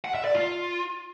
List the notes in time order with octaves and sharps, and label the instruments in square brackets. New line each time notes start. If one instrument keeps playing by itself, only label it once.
[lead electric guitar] F#5
E5
D5
F4